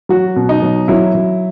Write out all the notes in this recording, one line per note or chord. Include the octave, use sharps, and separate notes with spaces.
F#3 F#4
B2
D#4
F#3
F#3 E4
F#3